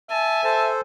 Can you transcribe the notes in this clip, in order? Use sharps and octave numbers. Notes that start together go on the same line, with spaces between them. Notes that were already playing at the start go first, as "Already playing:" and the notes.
E5 G#5 A5
A4 C5 A5